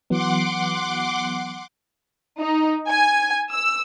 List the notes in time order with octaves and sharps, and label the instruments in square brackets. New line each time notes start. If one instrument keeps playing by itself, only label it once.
[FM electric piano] E3 F#3 B3 [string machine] F#5 C6 D6
[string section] D#4
G#5
E6